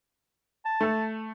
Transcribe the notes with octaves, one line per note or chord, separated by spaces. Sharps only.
A5
A3 A4